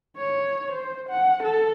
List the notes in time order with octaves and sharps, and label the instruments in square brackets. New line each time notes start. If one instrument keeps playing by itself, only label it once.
[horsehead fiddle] C#5
C5
F#5
A4